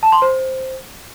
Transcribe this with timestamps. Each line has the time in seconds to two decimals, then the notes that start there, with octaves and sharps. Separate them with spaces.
0.03 A5
0.12 C6
0.22 C5